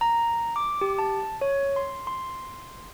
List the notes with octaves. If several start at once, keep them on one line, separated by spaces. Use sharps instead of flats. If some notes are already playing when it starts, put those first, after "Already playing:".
A#5
D6
G4
A5
C#5
C6
C6